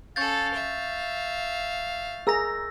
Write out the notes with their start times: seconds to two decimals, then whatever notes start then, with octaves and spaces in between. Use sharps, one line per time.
0.16 C#4 A4 F5 C#6 G6 A6
0.54 E5
2.27 G#4 A#4 A#5 E6 A#6